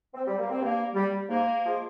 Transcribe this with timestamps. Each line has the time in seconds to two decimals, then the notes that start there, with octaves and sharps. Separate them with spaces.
0.14 C4
0.27 G3
0.38 A#3
0.49 C4
0.60 G2 A#3
0.94 G3
1.28 G#2 A#3
1.64 F3 G#3